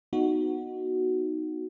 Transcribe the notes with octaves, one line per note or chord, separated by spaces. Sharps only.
B3 D#4 F#4